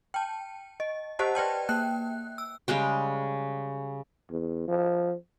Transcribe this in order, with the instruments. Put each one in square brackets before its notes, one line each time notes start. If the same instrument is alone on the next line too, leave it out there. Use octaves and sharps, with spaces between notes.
[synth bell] G5 A5
D#5
G4 C5 D#5 F#5 A5
B4 D5 G5 A5
A#3 G5 F#6
E6
[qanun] C#3 G3 G#3 G5
[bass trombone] E2
F3